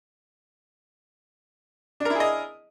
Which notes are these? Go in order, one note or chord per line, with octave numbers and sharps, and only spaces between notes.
D4 E4 G#4 A#4 D#5